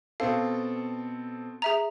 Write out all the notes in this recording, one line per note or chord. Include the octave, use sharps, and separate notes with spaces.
B2 C4 A4 F5
G#4 E5 A#5